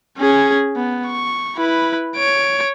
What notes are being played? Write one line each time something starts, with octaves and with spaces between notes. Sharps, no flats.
C#4 G#4
B3
C#6
E4 B4
C#5 D7